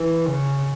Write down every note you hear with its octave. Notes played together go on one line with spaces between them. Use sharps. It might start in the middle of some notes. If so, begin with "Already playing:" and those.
Already playing: E3
C#3